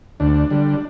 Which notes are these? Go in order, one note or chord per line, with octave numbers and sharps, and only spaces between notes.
D2 D4
D3 G3